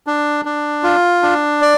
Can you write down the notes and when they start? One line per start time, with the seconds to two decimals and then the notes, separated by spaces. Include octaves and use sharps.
0.07 D4
0.45 D4
0.83 F4
1.22 D4
1.62 D5